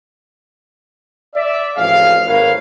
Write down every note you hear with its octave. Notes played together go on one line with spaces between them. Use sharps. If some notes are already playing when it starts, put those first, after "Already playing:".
D5 E5
A1 F2 F3 G#4 F5
G#1 A3 A#4 B4 C#5 F5